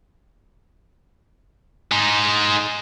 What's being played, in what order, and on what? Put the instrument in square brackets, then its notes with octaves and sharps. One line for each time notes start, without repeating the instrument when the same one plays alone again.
[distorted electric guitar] G#3 D#4